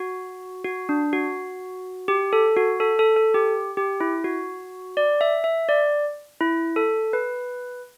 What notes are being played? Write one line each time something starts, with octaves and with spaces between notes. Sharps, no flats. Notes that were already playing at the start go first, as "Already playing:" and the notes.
Already playing: F#4
F#4
D4
F#4
G4
A4
F#4
A4
A4
A4
G4
G4
E4
F#4
D5
E5
E5
D5
E4
A4
B4